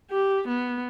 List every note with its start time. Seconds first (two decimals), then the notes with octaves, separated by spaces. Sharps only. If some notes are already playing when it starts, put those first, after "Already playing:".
0.11 G4
0.48 B3